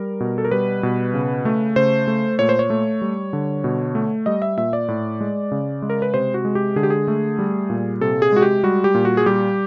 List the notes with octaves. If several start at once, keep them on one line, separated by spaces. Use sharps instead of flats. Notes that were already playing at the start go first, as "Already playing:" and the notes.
Already playing: G3 A#4
B2
A4
A#4
G3 B4
B2
C#3
A3
C#3 C5
A3
A#2 C#5
C5
C#5
A3
G3
D3
B2
A3
G3 D#5
E5
A#2 E5
D5
A2
G#3
C#3
G#3
A#4
B4
C3 C5
F#4
G#3
G4
D3 G#4
G4
G#4
A3
G3
A#2
C3 A4
G#4
G#3 F#4
G4
G3 F#4
G4
A#2
F#4
G#4
G3 G4